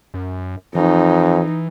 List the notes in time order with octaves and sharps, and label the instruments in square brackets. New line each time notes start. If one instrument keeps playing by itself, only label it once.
[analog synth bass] F#2
[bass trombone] F2 [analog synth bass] E3 [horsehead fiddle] D#4